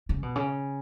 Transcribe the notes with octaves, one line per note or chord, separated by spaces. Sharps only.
C#3
B2
C#3